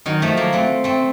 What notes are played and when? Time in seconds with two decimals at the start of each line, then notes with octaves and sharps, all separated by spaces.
0.06 D#3 F#3
0.22 F3 A3
0.37 F#3 A#3
0.53 A3 C4
0.84 A3 C4